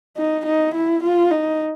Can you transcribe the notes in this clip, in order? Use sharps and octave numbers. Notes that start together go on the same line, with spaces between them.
D#4
D#4
E4
F4
D#4